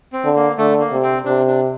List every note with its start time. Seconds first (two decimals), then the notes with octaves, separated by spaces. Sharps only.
0.13 C4
0.25 D3
0.36 A#3
0.58 D3 A3
0.80 A#3
0.92 C3
1.03 C4
1.25 C3 D4
1.47 D4